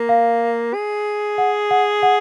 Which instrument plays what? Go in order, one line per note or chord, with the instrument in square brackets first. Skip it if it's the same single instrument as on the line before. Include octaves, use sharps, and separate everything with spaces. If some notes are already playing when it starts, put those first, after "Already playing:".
Already playing: [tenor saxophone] A#3
[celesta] F5
[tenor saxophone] G#4
[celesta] F#5
F#5
F#5